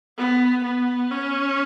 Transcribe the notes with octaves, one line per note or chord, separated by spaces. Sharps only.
B3
B3
C#4